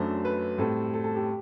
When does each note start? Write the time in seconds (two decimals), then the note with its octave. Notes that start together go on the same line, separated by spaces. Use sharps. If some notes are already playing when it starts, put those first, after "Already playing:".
Already playing: F#2 F#3 A3 D4 C5
0.25 B4
0.58 A2 G3 C4 A4
0.94 A4
1.04 A4
1.16 G4